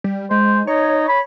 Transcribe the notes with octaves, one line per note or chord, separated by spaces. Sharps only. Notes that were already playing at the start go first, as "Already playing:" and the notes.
G3
G#3 C5
D#4 C#5
B5